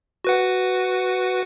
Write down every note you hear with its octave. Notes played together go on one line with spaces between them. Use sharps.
F#4 B4 F#5